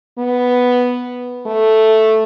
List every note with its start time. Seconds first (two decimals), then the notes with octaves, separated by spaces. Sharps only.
0.18 B3
1.46 A3